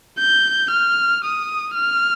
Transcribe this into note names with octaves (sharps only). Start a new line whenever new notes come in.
G6
F6
D#6
F6